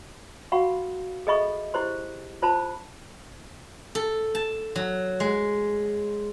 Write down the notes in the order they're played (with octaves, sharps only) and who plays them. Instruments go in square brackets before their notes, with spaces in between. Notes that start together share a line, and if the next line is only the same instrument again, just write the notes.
[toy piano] F#4 F5 F#5 B5 C#6
G#4 A4 D#5 E5 B5 C#6
E4 G4 C5 C6
F4 C5 A5 B5
[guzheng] A4
A5
F#3
G#3